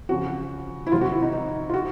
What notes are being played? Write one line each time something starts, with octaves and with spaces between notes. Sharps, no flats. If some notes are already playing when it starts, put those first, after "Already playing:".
F2 C#3 F3 F#4
E4
F2 C3 D#3 F#3 F4
F#4
E4
D#4
D#4
F4
F#4